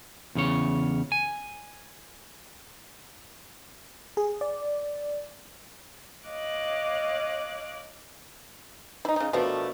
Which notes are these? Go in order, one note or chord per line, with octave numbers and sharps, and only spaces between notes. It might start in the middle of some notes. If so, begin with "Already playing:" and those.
E2 C#3 C#5
G#5
G#4
D5
C#5 D#5 F5 D6 F#6
D#4 E4 C5
C#3 D#4
B2 F3 A3 B3 D4 A#4